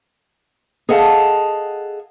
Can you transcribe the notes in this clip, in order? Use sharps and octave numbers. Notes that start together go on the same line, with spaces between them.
G#4 A4 D#5 F5 F#5 A5